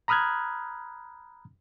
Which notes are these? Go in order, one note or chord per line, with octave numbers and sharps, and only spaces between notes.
A#5 B5 D#6 F6 F#6 G#6